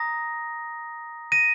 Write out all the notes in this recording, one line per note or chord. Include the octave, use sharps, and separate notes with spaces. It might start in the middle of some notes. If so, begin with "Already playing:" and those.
Already playing: A#5 D#6 A#6
A#6 D#7